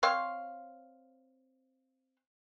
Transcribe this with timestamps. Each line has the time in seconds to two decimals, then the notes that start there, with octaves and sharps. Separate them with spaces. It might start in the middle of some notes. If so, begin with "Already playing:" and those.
0.03 C4 C#5 F5 C6